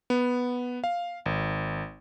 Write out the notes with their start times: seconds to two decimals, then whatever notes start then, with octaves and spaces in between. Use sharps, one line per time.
0.10 B3
0.84 F5
1.26 G#1